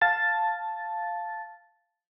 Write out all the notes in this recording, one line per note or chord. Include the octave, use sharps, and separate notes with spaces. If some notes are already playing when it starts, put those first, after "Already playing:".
F5 A5 A6